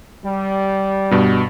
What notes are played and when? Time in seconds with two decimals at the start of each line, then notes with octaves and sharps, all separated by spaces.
0.24 G3
1.11 G2 B2